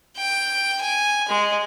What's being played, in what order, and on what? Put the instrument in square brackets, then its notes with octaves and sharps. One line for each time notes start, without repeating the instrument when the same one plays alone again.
[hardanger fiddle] G5
G#5
G#3